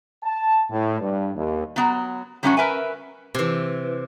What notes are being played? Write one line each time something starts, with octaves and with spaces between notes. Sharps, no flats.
A5
A2
G2
D#2
F#3 B3 A#5
F#3 G3 A3 C#4 E4 F#4
A#4 B4 E5 G#5
C3 E3